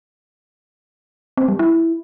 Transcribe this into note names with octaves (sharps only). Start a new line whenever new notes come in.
C4
G3
E4